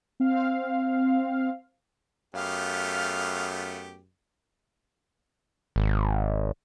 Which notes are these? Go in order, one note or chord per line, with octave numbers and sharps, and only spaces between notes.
C4 F5
F#2 A3 B3 G4 F5
G#1